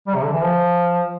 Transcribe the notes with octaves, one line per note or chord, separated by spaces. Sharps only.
G3
C3
D3
E3
F3